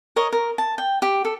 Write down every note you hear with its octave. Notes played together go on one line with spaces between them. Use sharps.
A#4 C#5 D#5
A#4
A5
G5
G4
A4